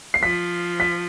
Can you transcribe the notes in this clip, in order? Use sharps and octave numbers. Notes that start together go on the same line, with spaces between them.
C7
F3 B6
B6